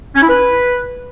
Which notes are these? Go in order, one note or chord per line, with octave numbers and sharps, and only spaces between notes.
C#4
E4
B4